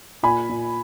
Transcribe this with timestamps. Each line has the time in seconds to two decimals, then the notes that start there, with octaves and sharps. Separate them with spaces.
0.23 A#2 G#5 B5
0.49 A#2